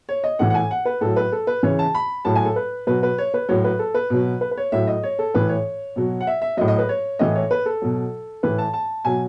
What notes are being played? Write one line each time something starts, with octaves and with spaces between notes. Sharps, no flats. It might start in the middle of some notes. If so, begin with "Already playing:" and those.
C#5
D#5
A2 E3 F#5
F#5
G#5
F#5
B4
A2 F#3 A4
B4
A4
B4
C#3 E3 C#5
A5
B5
A2 F#3 A5
G#5
A4
B4
B2 F#3 B4
B4
C#5
B4
A2 F#3 C#5
B4
A4
B4
B2 F#3
B4
B4
C#5
A2 F#3 E5
D#5
C#5
A4
A2 E3 B4
C#5
B2 F#3
F#5
E5
E5
A2 F#3 D#5
D#5
B4
C#5
A2 E3 D#5
C#5
B4
A4
B2 F#3
A2 E3 B4
A5
A5
B2 F#3 G#5